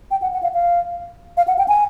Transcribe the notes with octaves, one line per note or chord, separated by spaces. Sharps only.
G5
F#5
F#5
F5
F5
F5
F#5
G5
G#5